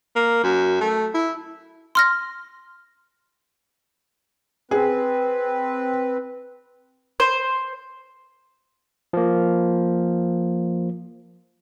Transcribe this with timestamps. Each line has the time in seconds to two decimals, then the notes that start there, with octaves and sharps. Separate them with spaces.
0.16 A#3
0.44 F#2
0.81 A3
1.14 E4
1.95 C6 F6 A#6
4.71 C4 G#4 B4
7.20 C5
9.13 F3 A#3